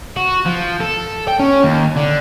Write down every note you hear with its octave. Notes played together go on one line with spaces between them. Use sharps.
F#4
F3
A4
G5
C#4
D#2
D3